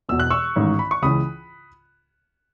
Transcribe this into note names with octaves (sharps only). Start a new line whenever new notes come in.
E1 E2 B2 E6
F#6
C#6 E6
A1 G#2 D#3
B5
C#6
C#2 C#3 E3 B5 D#6